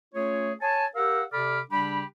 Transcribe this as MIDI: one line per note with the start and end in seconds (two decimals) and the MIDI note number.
0.14 0.52 57
0.14 0.52 61
0.14 0.52 65
0.14 0.52 68
0.14 0.52 73
0.61 0.85 73
0.61 0.85 80
0.61 0.85 81
0.95 1.23 67
0.95 1.23 70
0.95 1.23 77
0.95 1.23 78
0.95 1.23 88
1.32 1.60 48
1.32 1.60 69
1.32 1.60 74
1.32 1.60 83
1.32 1.60 86
1.32 1.60 89
1.71 2.03 49
1.71 2.03 55
1.71 2.03 62
1.71 2.03 67
1.71 2.03 83